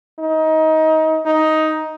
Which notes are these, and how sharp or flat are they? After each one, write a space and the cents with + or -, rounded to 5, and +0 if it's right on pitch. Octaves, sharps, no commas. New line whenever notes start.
D#4 +25
D#4 +10